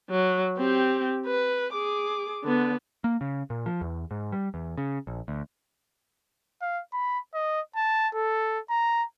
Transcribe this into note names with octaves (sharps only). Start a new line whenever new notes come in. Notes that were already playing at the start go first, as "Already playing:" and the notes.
F#3
C4 G4
B4
G#4 D6
D3 B3
A#3
C#3
A#2
F3
E2
G#2
G3
E2
C#3
A#1
D2
F5
B5
D#5
A5
A4
A#5